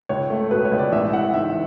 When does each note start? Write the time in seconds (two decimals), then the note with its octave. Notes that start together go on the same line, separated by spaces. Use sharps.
0.09 C#2 C#5
0.30 A3
0.51 B2 B4
0.65 C#5
0.72 C#2
0.79 D5
0.92 A1 E5
1.13 E3 F#5
1.34 G#2 E5